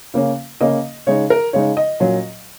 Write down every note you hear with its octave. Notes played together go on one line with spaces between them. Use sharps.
C#3 A#3 C#4
C#3 A#3 C#4 D#5
C#3 G#3 D#4 C#5
A#4
C#3 G#3 D#4 C#5
D#5
A#2 F#3 C#4